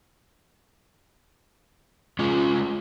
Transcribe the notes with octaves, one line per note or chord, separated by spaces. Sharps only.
G#3 C#4 F4